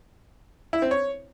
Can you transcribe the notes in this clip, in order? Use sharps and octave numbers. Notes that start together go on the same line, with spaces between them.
E4
C4
C#5